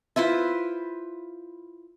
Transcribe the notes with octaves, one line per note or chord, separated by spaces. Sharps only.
E4 F4 B4 C5